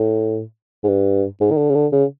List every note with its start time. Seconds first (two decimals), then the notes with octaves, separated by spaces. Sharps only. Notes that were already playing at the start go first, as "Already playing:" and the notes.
Already playing: A2
0.83 G#2
0.88 G2
1.41 G#2
1.51 D#3
1.57 D3
1.69 C#3
1.74 D3
1.92 C#3